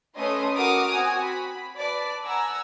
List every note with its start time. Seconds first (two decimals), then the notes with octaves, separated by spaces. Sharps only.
0.16 A3 C#4 B4 D#5 C6 D#6
0.56 F#4 A#4 D6 D#6 F6
0.92 C4 F#4 G#5
1.25 B5
1.77 B4 D5 A5
2.26 F#5 G#5 A#5 E6